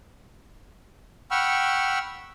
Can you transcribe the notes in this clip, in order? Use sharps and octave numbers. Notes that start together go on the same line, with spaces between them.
F#5 G5 B5 C#6 E6 F6